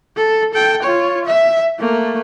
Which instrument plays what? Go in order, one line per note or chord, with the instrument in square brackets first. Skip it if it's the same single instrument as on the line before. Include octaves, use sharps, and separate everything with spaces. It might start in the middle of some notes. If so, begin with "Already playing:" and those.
[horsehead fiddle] A4
A4 G5
F4 C#5
E5
A3 A#3